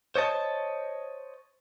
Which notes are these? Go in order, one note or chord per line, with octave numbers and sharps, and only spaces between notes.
C5 C#5 D#5 A5